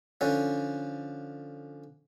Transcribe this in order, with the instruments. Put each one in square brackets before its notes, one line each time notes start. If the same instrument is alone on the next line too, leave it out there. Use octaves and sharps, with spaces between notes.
[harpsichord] D3 F3 C#4